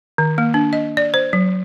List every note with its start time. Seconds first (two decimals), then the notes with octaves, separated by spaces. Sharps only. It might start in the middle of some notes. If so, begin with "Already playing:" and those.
0.18 D#3
0.38 A#3
0.54 D4
0.73 D#5
0.97 D5
1.14 C5
1.33 F#3